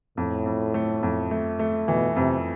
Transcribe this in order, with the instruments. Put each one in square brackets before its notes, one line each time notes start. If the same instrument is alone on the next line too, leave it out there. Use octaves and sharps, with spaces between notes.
[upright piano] F2 [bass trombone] A2
[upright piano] F2
A3
F2
A3
A3
[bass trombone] B2 [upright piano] E3
[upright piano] F2 [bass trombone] C3